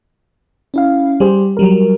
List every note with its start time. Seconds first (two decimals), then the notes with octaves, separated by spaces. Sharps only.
0.74 C#4 E4 F5
1.20 G3 G4 G#4 C5
1.57 F#3 G3 A#4